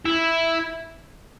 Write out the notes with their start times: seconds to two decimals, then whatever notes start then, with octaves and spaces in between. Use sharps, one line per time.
0.06 E4